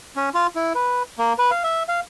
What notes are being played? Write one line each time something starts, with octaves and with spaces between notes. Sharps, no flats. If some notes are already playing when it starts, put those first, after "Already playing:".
C#4
F4
E4
B4
A#3
B4
F5
E5
F5